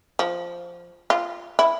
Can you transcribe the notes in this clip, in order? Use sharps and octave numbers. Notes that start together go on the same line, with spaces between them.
F3
F4
E4